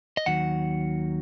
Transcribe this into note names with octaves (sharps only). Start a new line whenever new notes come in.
D#5
D#2 D#3 F#3 F#5